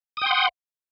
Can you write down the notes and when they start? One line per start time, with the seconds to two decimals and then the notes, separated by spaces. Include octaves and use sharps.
0.17 D#6
0.22 G5
0.26 C6
0.31 F#5